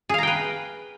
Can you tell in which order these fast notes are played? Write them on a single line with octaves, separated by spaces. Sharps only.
G#4 F5 A#5 G5 B4